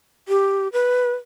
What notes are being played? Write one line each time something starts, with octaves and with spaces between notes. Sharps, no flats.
G4
B4